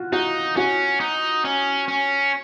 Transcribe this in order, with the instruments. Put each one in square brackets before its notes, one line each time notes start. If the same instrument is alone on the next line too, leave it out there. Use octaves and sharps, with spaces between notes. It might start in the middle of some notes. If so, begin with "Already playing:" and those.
Already playing: [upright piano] F4 F#4
[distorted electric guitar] D#4 [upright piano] F#4
[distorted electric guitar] C#4 [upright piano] F#4
[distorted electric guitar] D#4
C#4
C#4